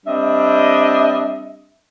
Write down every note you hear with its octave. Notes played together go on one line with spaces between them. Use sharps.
G3 C4 D4 D#5 E5